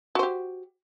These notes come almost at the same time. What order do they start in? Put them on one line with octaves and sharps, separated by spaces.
F#4 C5 G4